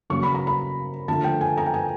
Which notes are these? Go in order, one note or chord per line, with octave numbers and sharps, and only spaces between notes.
C#3 F#3 A#3 C#4 C#6
B5
A#5
B5
D3 F3 A3 A5
G5
G#5
A#5
G5
G#5